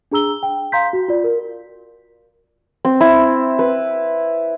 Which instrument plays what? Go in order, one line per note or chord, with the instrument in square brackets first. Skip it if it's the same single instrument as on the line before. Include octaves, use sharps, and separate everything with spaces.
[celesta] D4 G#4 A#5 E6 G7
G5
F5 A#5 C6 G6 B6
F#4
F4 D5
A#4
[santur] C4
E4
B4